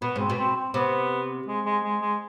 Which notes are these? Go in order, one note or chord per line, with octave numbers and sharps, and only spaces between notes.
B2 B3
G#2 C4
B2
C4
C4
C3 B3
G#3
G#3
G#3
G#3